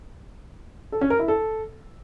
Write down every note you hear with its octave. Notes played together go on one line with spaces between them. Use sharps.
A4
C#4
A#4
E4
A4